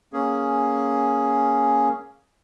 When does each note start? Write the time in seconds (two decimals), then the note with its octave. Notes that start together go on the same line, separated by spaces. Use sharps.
0.13 A#3 C#4 G#4